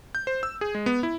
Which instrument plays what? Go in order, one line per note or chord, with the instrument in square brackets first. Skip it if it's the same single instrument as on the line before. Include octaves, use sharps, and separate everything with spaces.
[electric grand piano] G6
C5
E6
G#4
G#3
B3
E4